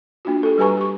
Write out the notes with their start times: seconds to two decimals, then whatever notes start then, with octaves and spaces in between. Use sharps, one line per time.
0.25 A#3 D4 F4 F#4
0.43 G4 A4
0.58 G3 G4 B4 G#5 A#5 C#6
0.77 G4 C#6